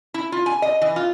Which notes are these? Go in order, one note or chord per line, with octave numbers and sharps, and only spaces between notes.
E4
F4
G#5
D#5
E3
F4